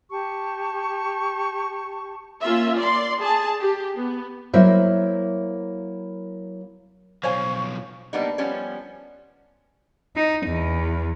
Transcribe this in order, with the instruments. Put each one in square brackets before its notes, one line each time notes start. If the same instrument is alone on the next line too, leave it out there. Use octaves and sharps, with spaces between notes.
[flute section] G4 A5 C#6
[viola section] A#3 C#4 F4 A#4 E5
D5 C6
G#4 A5
G4
B3
[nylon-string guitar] F#3 A#3 E4 A#4 C5 E5
[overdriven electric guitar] B1 F3 [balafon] C5 [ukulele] C#5 F5 G#5 [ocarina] C#6
[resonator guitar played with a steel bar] G3 A#3 B3 D4 D#4
F3 G3 B3 C#4
[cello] D#4
E2